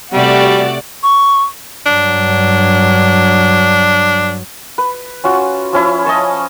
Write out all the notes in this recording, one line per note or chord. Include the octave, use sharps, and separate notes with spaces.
C3 G3 A3 F#4 D5
C#6
G2 F#3 D4
B4
C#4 F4 F#4
F3 C#4 E4
D#5 G#5 A5 C#6